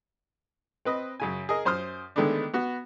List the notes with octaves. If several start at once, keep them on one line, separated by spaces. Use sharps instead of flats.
C4 B4 D#5
F#2 C#3 G#5
G#4 A#4 D#5
F#2 C5 C6 D#6 F6
D3 D#3 G#3 A3 B3 D4
B3 F#4